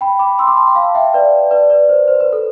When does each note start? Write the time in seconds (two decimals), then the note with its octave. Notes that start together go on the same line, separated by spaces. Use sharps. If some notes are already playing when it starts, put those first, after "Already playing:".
0.01 G5 B5
0.19 B5 D6
0.39 C6 E6
0.47 B5 D6
0.57 A5 C6
0.67 G5 B5
0.76 F5 A5
0.95 E5 G5
1.14 B4 D5
1.51 B4 D5
1.70 B4 D5
1.89 C5
2.08 C5
2.20 B4
2.32 A4